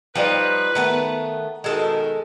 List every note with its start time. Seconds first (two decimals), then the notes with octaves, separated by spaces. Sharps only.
0.15 F3 G3 D#4 B4
0.75 D#3 A3 B3
1.64 B2 D#3 G#3 A4